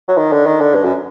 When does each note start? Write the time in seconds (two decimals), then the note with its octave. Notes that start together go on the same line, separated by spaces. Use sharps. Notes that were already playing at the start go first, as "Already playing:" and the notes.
0.08 F#3
0.17 D#3
0.32 D3
0.46 D#3
0.60 D3
0.75 G2
0.84 F#2